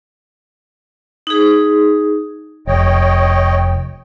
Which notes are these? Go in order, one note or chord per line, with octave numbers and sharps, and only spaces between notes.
D#4 G#4
F1 C#5 D#5 G5